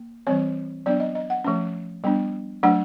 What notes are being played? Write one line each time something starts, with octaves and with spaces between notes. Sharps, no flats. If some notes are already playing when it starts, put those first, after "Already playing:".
Already playing: A#3
E3 G3 C4 C#5
F#3 B3 D4 D5
D#5
D#5
F#5
F3 A3 C#4
G3 B3 D4
F#3 A3 D4 F#5